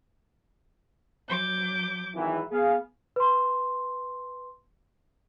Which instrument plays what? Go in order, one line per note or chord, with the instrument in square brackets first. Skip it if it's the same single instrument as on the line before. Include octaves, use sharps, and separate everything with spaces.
[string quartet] F#3 D6 G6
[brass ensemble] G#1 E3
[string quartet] B3 [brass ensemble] G#4 F5
[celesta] B4 C6